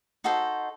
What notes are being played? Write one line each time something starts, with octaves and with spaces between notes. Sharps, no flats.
D#4 F#4 A4 C5